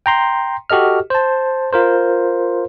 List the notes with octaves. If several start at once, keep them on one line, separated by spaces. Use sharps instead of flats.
G5 A#5 C6
F#4 G4 A4 D#5 F6
C5 A5
F4 A#4 C5